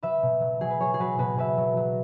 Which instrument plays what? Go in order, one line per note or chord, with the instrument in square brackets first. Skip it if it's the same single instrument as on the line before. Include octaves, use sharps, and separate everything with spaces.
[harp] F#3 B4 E5
B2
F#3
F#3 G#4
B4
F#3 G#4 C#5
G#4
F#3 F#4 B4
B2 F#4 B4
B2 B4 E5
F#3
F#3